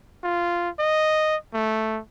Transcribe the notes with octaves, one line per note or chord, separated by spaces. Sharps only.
F4
D#5
A3